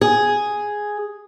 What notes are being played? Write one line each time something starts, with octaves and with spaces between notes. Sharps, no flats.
G#4